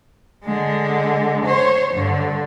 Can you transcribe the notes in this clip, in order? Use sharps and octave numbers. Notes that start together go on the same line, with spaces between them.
D3 G#3
C5 C#5
G2 D3